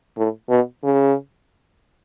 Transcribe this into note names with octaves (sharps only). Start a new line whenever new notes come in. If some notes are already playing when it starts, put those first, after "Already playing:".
A2
B2
C#3